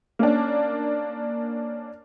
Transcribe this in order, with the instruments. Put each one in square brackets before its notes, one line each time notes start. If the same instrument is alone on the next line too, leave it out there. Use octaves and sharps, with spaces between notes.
[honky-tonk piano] A#3 C#4 D4